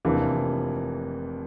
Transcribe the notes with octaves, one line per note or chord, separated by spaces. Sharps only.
F1 F2 E3 A#3 D4